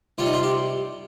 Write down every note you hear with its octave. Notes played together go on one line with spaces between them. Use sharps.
C2 C3 G3 F4
D#4
F4
G4